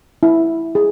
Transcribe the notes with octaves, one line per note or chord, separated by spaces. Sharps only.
E4
G#4